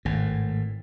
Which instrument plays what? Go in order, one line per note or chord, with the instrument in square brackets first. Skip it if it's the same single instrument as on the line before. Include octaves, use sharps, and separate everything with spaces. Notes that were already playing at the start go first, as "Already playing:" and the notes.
[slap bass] G#1 A2